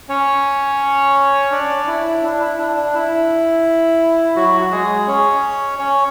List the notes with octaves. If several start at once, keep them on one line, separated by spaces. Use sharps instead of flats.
C#4 C#5
D4 D5
E4
D4
E4
D4
D4
E4
F#3 F#4
F#4
G#3 G#4
C#4 C#5
C#4 C#5